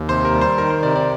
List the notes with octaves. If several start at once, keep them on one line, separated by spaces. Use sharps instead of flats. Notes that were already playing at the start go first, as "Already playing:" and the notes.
Already playing: D#2
C3 C5
A#4
G3
C5
D#3 A#4
C5
C3 D5
D5